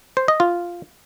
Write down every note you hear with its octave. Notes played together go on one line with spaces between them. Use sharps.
C5
D#5
F4